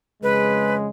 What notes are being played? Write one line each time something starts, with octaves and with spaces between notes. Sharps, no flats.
F2 C#3 G#3 B4